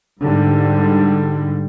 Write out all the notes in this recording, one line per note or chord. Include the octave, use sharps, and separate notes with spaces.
G#2 D3 G3